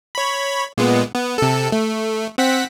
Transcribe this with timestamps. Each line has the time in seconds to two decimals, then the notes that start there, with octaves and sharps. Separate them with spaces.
0.15 C#5 B5
0.78 A#2 G#3 B3
1.15 B3
1.38 C3 A4
1.72 A3
2.38 C4 F#5 B6